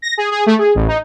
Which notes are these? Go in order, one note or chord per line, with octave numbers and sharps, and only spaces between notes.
A#6
G#4
G#4
A3
G#4
A1
D#4